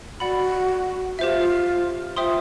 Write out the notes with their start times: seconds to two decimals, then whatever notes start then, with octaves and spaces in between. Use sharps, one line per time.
0.20 F#4 D5 F#5 B5
1.19 F4 G4 C5 E5
2.16 F4 C5 E5 G5 C6 D#6